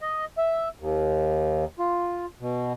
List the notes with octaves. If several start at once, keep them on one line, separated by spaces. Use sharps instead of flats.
D#5
E5
D#2
F4
B2